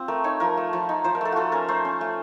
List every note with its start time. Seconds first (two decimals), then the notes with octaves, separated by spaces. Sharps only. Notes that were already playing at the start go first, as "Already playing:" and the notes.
Already playing: C4 F4
0.08 A3 A#4
0.24 D#4 C#5
0.40 F3 A#4
0.57 A3
0.73 F3
0.89 D#4
1.04 F3 C5
1.15 A#4
1.21 A3 A4
1.32 F4 F#4 A4
1.52 C#4 A#4
1.68 A3 C5
1.85 C#4
2.01 A3